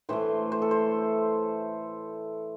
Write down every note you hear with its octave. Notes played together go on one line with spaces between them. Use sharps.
A2 E3 A3 C5
C5
A4
C5